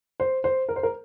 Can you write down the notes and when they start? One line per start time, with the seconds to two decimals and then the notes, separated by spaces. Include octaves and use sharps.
0.20 C5
0.44 C5
0.69 A#4
0.76 C5
0.83 A#4